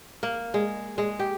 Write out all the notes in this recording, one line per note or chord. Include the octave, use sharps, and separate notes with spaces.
A#3
G#3
G#3
G4